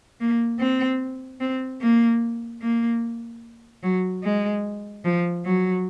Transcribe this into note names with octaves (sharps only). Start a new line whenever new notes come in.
A#3
C4
C4
A#3
A#3
F#3
G#3
F3
F#3